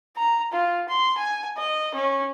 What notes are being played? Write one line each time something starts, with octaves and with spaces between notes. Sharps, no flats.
A#5
F4
C6
G#5
D#5
C#4